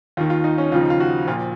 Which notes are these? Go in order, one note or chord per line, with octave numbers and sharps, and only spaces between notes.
D#2 D#3 F4
F4
D#4
C#4
D#2 C#3 F3 F4
D#4
F4
F#4
A#1 A#2 F3 F4